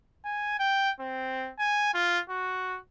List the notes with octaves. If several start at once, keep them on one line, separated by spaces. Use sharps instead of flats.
G#5
G5
C4
G#5
F4
F#4